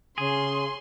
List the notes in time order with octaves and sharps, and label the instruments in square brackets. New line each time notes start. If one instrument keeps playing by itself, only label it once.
[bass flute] C#3 [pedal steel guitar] G#4 [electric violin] C6